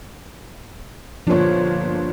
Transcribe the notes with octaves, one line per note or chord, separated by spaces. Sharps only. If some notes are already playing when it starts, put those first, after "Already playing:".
G1 A#2 F3 D4 C#5